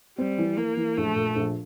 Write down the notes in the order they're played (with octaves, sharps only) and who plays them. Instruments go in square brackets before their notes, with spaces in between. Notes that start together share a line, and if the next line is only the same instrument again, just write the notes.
[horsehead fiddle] G3 [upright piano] C4
[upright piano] E3
[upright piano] E3 [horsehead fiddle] A#3
[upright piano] E3
[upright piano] A#1 [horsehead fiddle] A3
[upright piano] A#2
A#1